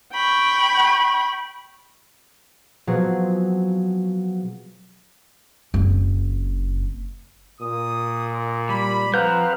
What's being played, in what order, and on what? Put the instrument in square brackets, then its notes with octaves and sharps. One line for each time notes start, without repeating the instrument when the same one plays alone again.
[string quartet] G5 B5 C#6
[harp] B2 F3 F#3 C4 G#4 C#6
[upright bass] F#1 C4
[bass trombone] A#2 [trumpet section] D#6
[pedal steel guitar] G3 [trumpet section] B5
[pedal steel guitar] F3 A#5 G6 [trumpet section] C4 F4 [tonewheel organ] B4 F5 F#5